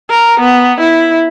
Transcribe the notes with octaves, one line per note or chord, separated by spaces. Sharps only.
A#4
B3
E4